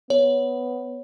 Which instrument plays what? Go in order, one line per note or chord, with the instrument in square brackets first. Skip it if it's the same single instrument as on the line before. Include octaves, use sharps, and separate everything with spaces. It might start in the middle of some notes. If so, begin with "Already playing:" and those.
[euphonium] B3 [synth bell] C#5